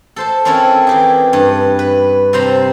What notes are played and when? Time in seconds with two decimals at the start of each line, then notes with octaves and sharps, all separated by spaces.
0.16 A4 C5 A5
0.45 C4 C#4 E4 A4 A#4
0.87 E3 G4 G#4
1.33 G2
1.79 B4
2.33 C3 G3 C5 A#5 B5